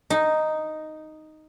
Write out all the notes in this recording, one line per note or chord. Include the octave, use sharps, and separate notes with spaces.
D#4